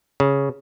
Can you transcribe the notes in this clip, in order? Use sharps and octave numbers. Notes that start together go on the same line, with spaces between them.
C#3